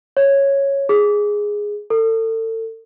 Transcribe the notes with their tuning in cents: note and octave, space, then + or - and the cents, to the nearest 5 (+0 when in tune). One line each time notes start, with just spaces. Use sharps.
C#5 -5
G#4 -5
A4 +35